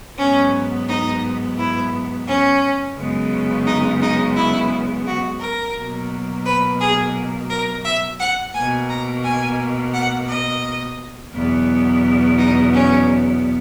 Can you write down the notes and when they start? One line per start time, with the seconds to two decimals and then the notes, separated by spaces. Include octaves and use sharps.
0.18 G#2 F#3 B3 C#4
0.88 D#4
1.58 E4
2.27 C#4
2.97 F#2 C#3 G#3 B3
3.66 D#4
4.02 D#4
4.36 E4
5.07 F#4
5.41 A#4
5.76 B2 F#3 A#3
6.45 B4
6.80 G#4
7.50 A#4
7.85 E5
8.20 F#5
8.54 B2 A#3 G#5
8.89 A#5
9.24 G#5
9.94 F#5
10.30 D#5
11.34 E2 B2 F#3 B3
12.38 D#4
12.74 C#4